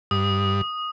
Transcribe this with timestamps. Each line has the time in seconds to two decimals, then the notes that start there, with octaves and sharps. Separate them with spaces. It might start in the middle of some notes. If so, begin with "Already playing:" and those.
0.11 G2 D#6